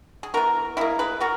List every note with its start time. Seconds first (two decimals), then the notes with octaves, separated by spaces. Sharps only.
0.23 G#4
0.34 E3 B3 F#4 A#4
0.77 B2 A#3 E4 G#4
0.99 G#4 B4
1.20 B3 F#4 A#4